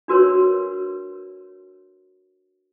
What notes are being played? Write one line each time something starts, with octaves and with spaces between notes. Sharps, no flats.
D4 F#4 A#4 B4 C#5